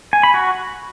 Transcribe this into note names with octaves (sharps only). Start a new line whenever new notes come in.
G#5
B5
F#4